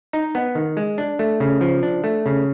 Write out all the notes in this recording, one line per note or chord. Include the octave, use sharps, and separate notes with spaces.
D#4
B3
D#3
G#3
D4
A3
C#3
F3
D4
A3
C#3